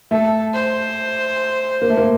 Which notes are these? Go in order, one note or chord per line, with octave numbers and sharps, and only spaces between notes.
A3 A4
C5
A#3
A3
A#3